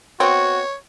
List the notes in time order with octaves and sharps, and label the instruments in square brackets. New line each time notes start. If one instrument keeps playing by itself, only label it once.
[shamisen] B3 C4 [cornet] F#4 [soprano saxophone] C#5